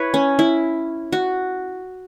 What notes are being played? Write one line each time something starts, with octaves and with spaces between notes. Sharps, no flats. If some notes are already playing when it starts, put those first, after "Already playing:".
Already playing: E4 B4 C#5
C#4
E4
F#4